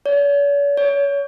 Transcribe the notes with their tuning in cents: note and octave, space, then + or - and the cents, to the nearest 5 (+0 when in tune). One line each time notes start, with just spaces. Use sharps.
C#5 +45
C#5 +25